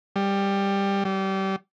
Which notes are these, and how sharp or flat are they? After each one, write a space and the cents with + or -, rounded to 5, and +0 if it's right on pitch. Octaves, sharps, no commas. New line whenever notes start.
G3 +15
G3 -25